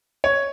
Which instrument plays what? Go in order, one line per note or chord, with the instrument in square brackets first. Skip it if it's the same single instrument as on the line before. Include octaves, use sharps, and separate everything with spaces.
[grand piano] C#5